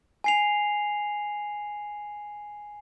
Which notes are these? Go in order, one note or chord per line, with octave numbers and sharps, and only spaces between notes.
G#5 C7 F7